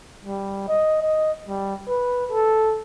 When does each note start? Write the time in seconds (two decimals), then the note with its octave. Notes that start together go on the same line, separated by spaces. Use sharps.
0.25 G3
0.68 D#5
1.02 D#5
1.48 G3
1.88 B4
2.32 A4